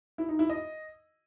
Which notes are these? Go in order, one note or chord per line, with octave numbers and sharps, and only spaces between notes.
E4
D#4
E4
D#5